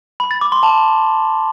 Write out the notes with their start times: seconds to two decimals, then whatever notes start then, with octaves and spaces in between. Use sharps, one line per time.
0.20 B5
0.31 A6
0.41 D6
0.52 C6
0.63 A5